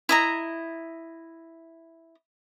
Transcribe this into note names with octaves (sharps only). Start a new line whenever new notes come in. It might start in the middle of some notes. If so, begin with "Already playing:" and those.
E4 D#5 A#5